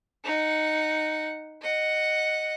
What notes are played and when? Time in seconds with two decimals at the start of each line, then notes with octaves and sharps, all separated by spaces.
0.24 D#4 F#5
1.62 D#5 F#5